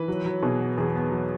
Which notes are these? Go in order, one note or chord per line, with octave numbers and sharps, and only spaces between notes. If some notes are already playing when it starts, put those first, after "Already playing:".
Already playing: E3 B4
F#3
F#3
B2 G#4
B3
E2 G#4
B3
F#3